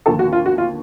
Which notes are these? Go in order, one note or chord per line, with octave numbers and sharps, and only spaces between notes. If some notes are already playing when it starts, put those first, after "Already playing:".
D#2 D3 F3 A4
F#4
F4
F#4
F4